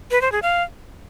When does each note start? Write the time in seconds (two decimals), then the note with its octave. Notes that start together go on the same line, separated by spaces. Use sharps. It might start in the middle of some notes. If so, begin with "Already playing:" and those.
0.11 B4
0.22 C5
0.32 G#4
0.42 F5